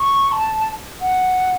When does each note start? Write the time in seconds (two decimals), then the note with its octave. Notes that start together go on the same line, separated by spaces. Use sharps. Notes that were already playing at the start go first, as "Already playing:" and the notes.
Already playing: C#6
0.32 A5
1.01 F#5